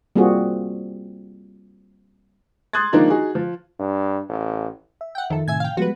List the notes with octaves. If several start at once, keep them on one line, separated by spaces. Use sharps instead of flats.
G3 A#3 C4 F4 F#4 G#4
C6 D#6 F#6 G#6 A6
D#3 F3 G#3 A#3 D4 D#4
D#4 F#4 G#4
F3
G2
A1
E5
F#5 G5
F2 D#3 A4
A2 C3 E5 G#5 G#6
F5 G5
F3 G3 G#3 B3 F#4 B4